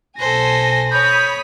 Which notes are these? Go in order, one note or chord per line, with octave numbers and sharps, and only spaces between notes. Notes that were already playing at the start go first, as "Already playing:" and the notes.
B1 A4 C5 G#5 A#6
C#5 B5 D#6 G6 B6